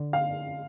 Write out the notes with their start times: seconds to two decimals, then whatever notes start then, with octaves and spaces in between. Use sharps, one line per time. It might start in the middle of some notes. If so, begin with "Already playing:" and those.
Already playing: D3
0.13 F5